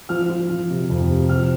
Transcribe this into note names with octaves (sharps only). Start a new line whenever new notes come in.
F3 F6
F3
F3
C3
F2
C3
F3 F6